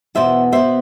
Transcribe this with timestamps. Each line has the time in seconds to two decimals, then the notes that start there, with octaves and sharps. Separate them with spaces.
0.15 E2 B2 B3 C5 E5
0.52 B2 B3 C5 E5